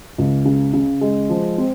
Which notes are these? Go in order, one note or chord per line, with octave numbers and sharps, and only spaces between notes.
C#2
C#3
C#3
G#3
F3
C4